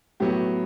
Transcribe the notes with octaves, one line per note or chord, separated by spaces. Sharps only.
A2 F#3 B3 G4